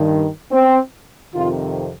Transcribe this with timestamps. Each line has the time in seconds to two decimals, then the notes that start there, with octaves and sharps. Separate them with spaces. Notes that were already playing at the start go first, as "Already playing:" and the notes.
Already playing: G2 D#3
0.52 C4
1.34 F2 C3 D#3 F4